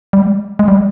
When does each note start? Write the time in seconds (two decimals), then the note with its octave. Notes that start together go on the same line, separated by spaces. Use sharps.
0.13 G3
0.19 G#3
0.59 G#3
0.68 G3